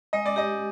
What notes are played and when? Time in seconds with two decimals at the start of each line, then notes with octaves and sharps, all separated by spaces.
0.13 G#3 D#5
0.26 D5
0.36 G4 D#5